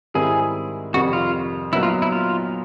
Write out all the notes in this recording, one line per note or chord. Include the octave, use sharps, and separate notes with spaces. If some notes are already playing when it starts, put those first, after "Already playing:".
G#2 D#3 G3 C4 E4 G#4
F2 C3 D#3 G3 F#4
F4
A#2 F#3 B3 D#4 E4
F4
E4
F4